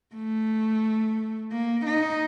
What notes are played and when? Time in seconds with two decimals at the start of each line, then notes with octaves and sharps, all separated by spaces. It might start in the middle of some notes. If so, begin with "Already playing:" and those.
0.15 A3
1.52 A#3
1.86 D#4